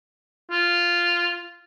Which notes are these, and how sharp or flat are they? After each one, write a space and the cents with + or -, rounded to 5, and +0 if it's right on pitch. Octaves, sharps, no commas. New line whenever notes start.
F4 -5